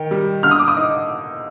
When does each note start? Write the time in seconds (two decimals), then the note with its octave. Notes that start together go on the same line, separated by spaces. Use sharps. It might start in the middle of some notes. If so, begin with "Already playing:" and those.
Already playing: D#3 G5
0.11 G3
0.43 D3 F6
0.51 D#6
0.59 D6
0.68 D#6
0.77 D#4